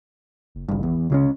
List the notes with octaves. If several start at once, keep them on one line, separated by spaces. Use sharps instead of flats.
F#1
G#1 C#2 G2
E2
C#2 C#3 F#3 C#4